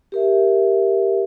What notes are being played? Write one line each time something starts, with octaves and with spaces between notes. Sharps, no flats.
G4 A#4 E5